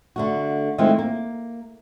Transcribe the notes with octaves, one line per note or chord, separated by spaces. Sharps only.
D3 A3 F#4
D#3 E3 G#3 A3 C4 F4
A#3